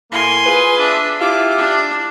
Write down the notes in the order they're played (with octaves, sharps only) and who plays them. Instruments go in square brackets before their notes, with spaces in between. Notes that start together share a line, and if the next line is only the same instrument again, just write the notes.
[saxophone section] A2 A#3 [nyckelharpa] G#5 C6
[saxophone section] F4 G#4 B4
[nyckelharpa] D4 E5
[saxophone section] E4 F4 G4 [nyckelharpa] D6
[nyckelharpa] D4